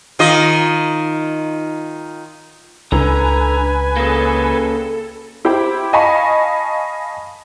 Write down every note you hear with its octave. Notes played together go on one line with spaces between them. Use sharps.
D#3 F4 D#5
C#2 D3 B4 G#5 A#5
C#3 A#3 A4
E4 G4 C5 G5 B5
D#5 F5 G#5 A5 B5 C#6